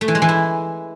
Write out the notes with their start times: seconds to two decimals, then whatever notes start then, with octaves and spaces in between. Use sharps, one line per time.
0.01 A3
0.08 E3
0.15 G#3
0.22 E3
0.29 E4